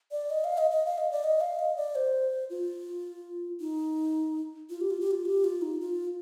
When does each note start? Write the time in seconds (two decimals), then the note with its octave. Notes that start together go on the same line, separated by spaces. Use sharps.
0.11 D5
0.30 D#5
0.44 F5
0.58 D#5
0.71 D#5
0.86 F5
0.98 D#5
1.12 D5
1.24 D#5
1.41 F5
1.59 D#5
1.77 D5
1.95 C5
2.50 F4
3.60 D#4
4.70 F4
4.81 G4
4.90 F4
5.00 G4
5.11 F4
5.25 G4
5.44 F4
5.62 D#4
5.80 F4